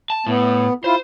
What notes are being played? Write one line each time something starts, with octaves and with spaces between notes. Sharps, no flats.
A5
A2 B3
E4 F4 C5